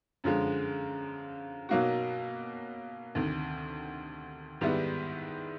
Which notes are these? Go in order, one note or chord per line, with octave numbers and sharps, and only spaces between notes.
F#2 D3 F3 G#3
B2 F#3 A#3 D#4 F#4
D2 C3 D#3
G#2 D#3 G3 B3 E4